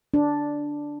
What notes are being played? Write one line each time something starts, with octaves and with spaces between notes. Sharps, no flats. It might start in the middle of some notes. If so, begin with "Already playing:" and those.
D4